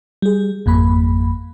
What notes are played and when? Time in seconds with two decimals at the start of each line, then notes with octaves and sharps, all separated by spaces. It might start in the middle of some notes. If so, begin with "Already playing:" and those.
0.22 G3 G#4
0.66 G#1 F2 A#3 B5